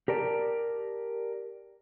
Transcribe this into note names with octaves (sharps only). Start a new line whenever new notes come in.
G4 A#4 D5 A5